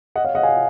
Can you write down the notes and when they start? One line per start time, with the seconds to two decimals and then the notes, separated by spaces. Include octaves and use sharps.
0.16 D#5 F#5
0.25 C#5 F5
0.35 D#5 F#5
0.43 F5 G#5